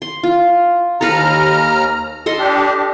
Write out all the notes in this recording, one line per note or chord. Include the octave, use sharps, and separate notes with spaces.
C6
F4
D#2 A4 B4 A#5 F6
A4 D#5 C6
D4 G4